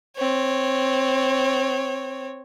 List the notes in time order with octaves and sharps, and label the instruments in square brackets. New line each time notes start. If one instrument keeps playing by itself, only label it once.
[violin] C4 C#5